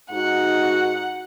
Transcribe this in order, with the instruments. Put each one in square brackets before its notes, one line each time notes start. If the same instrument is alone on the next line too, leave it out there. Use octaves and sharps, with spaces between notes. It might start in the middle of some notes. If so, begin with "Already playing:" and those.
[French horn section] G#2 D#4 F#4 [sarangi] F#5